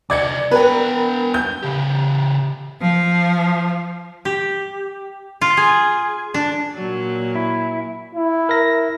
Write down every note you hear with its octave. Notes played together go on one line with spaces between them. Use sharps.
C2 D5 D#5 G#6 C#7
B3 A#4 B4 G5
G6
C#3 G4
F3
G4
F4
G#4
D4
A#2 F#3
E4
E4
A#4 E5 A#6